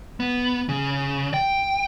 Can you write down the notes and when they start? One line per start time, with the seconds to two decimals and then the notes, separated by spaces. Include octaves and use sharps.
0.20 B3
0.69 C#3
1.34 G5